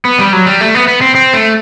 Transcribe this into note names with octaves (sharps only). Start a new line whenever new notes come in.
B3
G3
F#3
G3
A3
B3
B3
C4
C4
A3